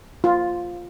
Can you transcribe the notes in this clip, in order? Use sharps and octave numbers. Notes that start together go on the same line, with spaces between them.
F4